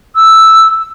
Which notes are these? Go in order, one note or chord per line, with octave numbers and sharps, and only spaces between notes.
E6